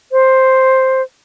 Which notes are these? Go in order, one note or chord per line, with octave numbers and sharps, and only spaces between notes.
C5